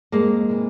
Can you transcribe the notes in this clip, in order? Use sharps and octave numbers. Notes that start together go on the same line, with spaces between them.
F2 G#3 A#3
C3 E3